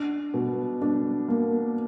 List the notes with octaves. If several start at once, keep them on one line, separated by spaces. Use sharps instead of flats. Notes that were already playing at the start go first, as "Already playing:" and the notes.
Already playing: D4
B2
D4
A#3